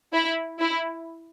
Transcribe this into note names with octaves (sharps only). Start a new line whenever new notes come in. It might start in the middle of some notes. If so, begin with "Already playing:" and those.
E4
E4